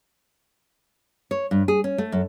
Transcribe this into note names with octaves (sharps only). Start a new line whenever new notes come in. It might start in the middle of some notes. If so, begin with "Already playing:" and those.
C#5
G2
G#4
C#4
A3
F#2